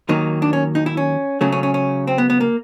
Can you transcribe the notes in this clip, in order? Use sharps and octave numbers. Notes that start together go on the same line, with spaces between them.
D#2 D#3 F#3 A#3 D#4
D4
C#4
D#4
E4
C#4
C#2 C#3 F#3 A3 C#4
C#4
C#4
C#4
C4
B3
B3
A#3